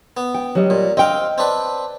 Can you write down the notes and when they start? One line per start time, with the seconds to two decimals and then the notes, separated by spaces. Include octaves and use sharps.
0.17 B3
0.35 G5
0.55 F#3 G3 D#5
0.70 A#2
0.97 C4 D#5 F5 G5
1.38 C4 D4 B4